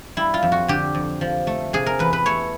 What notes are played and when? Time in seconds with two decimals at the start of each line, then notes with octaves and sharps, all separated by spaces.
0.17 G3 E4
0.34 F4
0.43 F2
0.52 F#4
0.68 D3 G4
0.95 F2
1.21 F3
1.47 A3
1.73 C3 G#4
1.86 A#4
1.99 E2 B4
2.13 B4
2.26 A3 C#5